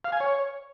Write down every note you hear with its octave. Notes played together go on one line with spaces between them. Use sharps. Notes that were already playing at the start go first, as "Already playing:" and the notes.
F5
G#5
C#5